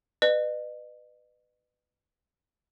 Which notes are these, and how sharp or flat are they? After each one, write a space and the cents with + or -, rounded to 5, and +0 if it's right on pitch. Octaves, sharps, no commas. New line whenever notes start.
B4 +10 D#5 -40